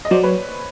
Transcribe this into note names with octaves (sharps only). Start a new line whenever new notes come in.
D#5
F#3 C5 D5
B4 C#5